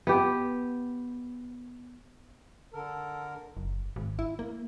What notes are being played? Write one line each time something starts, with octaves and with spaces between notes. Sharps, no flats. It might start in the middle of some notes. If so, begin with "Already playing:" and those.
B3 G4
D3 A4 A#4
F#1
G#1
E4
A#3